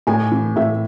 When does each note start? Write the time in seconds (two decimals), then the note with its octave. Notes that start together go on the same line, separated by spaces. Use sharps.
0.07 A2 G#5
0.31 E3
0.56 A2 E5